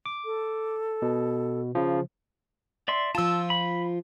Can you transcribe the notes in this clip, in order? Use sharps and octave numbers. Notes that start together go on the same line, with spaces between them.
D6
A4
B2
C#3 F3
D5 E5 C6
F3 F4 A5 E6
B5